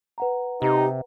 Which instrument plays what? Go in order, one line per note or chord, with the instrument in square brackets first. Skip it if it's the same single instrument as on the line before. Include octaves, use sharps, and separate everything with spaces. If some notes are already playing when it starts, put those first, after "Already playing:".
[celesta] B4 F#5 A#5
[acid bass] C3 [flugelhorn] D#4 [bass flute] G4